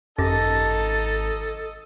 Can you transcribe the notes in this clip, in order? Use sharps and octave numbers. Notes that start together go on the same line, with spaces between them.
G#1 F#2 D#4 G4 A4 D#5 A5 A#6